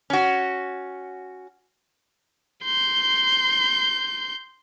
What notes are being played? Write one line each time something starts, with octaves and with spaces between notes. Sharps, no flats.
C#4 F#4
C6 G6